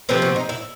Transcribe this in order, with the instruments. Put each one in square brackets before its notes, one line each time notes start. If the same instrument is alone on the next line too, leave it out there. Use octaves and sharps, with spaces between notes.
[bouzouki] C3 F3 A3 C4 B4
F#4
D#4
E4